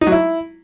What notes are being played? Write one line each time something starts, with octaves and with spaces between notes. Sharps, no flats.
D#4
F#3
E4